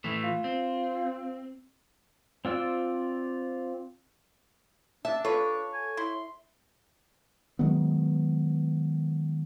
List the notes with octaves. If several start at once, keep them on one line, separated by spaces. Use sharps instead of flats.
A2 E3 A3
F4
C4
C4 F4 D5 E6
D4 E5 A5
F4 A4 B4 C#5
G#5
E4 C6
D#3 F#3 G#3 B3